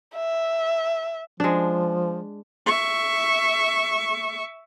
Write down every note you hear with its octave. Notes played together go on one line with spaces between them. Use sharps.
E5
F3 G#3 D4
E5 C#6